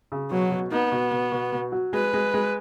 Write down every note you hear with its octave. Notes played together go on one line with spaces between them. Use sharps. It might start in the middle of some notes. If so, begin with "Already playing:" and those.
C#3
B2 F#3
B2
B3 D#4
B2
B2
B2
B2
F#3
G#3 B4
G#3
G#3